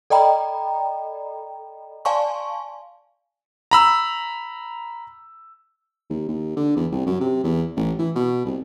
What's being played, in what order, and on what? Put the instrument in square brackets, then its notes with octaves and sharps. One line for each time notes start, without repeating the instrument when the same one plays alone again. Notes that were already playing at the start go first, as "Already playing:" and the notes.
[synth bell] A4 D5 D#5 G5 A#5 B5
D5 F5 G#5 A5 C6 C#6
[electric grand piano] A#5 B5 E6
[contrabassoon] D#2
D#2
D3
E2
C2
F#2
C3
E2
A1
E3
B2
C2